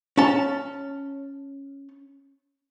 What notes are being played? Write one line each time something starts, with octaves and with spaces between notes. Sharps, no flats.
C#4 A5